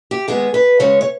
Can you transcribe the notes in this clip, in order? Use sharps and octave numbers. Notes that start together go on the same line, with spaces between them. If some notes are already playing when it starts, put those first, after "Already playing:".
G4
D#3 G#3 B3 G#4
B4
C#3 G#3 C#4 C#5
C#5